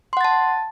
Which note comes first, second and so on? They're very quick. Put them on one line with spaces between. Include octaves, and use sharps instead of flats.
C6 F#5 A6 A5